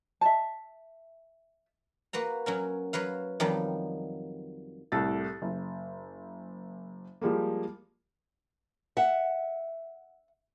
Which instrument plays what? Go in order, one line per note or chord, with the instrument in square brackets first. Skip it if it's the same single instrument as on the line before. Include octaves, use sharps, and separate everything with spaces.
[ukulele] E5 A5
[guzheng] A#3 F#4 B4 A#5
F#3 C#4 A#4
F#3 F#4 B4 F5
F2 D#3 F#3 G3
[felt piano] C2 A2 A4 A6
F#1
F3 G3 G#3 A#3
[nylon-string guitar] E5 F#5